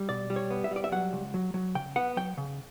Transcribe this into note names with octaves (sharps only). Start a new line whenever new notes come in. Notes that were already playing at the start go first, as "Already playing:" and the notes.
Already playing: G3
B2 D5
G3
C#5
B3
E5
G3 D5
E5
F#3 F#5
C#2
F#3
F#3
C#3 G5
B3 F#5
F#3 G5
C#3